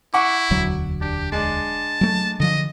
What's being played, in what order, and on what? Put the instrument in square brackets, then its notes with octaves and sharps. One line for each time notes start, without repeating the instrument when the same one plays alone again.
[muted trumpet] E4 [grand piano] F#5 C#6 D6
[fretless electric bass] E1 D2 F#3
[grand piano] D4 [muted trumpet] G4
[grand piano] G#3 D4 [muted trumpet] A5
[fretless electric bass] F#3 A3
[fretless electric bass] D3 F3 [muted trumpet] D#5